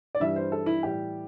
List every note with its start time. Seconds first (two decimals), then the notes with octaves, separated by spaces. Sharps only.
0.15 D5
0.20 G2 E3 G3 E5
0.36 C5
0.52 A4
0.66 E4
0.82 A2 E3 G3 G4